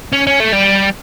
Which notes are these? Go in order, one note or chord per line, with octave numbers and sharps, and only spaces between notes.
C#4
C#4
A3
G3